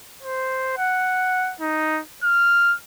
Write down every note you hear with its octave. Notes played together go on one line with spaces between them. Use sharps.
C5
F#5
D#4
F6